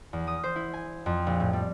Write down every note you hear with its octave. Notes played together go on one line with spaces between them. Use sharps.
E2
D#6
C5
E4
G#5
F2
A#1
A2
G3